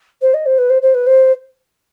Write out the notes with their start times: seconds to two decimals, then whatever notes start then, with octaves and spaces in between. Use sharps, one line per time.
0.21 C5
0.34 D#5
0.46 C5
0.58 B4
0.69 C5
0.82 C5
0.94 B4
1.06 C5